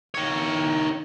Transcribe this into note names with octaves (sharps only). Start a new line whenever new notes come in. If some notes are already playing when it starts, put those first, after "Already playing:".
D#3 C#5